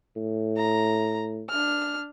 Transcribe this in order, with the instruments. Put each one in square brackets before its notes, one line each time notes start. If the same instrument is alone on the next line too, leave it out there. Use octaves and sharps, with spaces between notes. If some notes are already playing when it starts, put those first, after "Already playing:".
[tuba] A2
[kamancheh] A#5
D4 F6